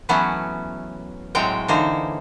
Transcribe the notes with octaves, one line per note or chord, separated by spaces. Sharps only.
E3 F#3 A3 B3 C#4 E4
A2 F#3 G#3 C4 C#5 G5
D3 E3 A#3 D#4 C5 C#5